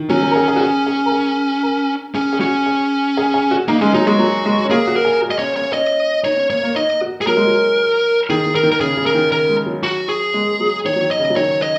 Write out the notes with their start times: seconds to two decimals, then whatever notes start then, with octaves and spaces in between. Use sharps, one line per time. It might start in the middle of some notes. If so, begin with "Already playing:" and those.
Already playing: D#3
0.09 F#3 C#4
0.23 F#3
0.31 A#4
0.36 G#4
0.48 G#4
0.56 F#4
0.61 G#4
0.86 G#4
1.06 A#4
1.12 G#4
1.63 A#4
2.15 C#4 G#4
2.33 G#4
2.40 C#4 F#4
2.66 G#4
3.17 G#4
3.34 G#4
3.51 F#4
3.68 A#3 D#4
3.81 G#3 C#4
3.94 F#3 D#4
4.07 G#3 F#4
4.19 F#3
4.45 G#3
4.65 C#4
4.70 A#3 G#4
4.88 F#4
4.96 A#4
5.05 G#4
5.22 F#4
5.30 D#5
5.39 C#4 C#5
5.56 C#4 C#5
5.73 C#4 D#5
6.24 D#4 C#5
6.37 C#4
6.50 A#3 C#5
6.63 A#3
6.75 D#4 D#5
7.01 F#4
7.21 G#4
7.27 F#3 A#4
7.37 G#3
7.47 F#3
8.30 D#3 G#4
8.46 D#3
8.55 A#4
8.63 D#3
8.72 A#4
8.80 C#3 G#4
8.97 C#3
9.06 A#4
9.15 D#3
9.32 A#4
9.49 G#3
9.66 F#3
9.83 F#4
10.09 G#4
10.34 G#3
10.60 F#3
10.85 D#3 C#5
10.96 F#3
11.02 D#3
11.11 D#5
11.20 C#3
11.30 F#3
11.36 D#3 C#5
11.62 D#5